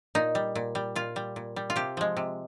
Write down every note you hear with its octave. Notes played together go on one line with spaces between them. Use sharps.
A#2 D#4
G3
A#2
G3
A#2 F4
G3
A#2
G3
F4
C3 G4
F3 G#3
C3